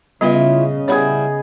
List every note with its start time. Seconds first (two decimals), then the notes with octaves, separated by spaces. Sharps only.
0.21 C#3 G3 B3 E4 F4 B4 D#5 E5
0.88 G3 B3 E4 G#4 C#5 B5